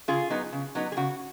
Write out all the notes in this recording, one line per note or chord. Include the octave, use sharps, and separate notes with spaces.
C#3 F4 G#4
F#3 B3 D#4
C#3
F#3 B3 D#4
G#4
C#3 F#4